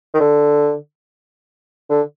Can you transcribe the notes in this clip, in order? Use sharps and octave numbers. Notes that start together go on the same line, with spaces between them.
D#3
D3
D3